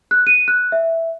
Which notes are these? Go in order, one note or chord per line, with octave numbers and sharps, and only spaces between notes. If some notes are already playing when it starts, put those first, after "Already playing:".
F#6
D#7
F#6
E5